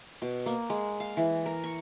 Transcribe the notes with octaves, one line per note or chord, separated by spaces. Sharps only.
B2
A#3
G#3
F5
E3
A#4
C#6